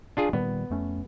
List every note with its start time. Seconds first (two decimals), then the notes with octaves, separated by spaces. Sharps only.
0.17 D4 F4 G#4
0.33 A#2 D#3 G3 B3
0.71 F2 A3 C#4